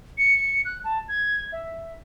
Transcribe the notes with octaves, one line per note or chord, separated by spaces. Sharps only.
C#7
F#6
A5
G#6
E5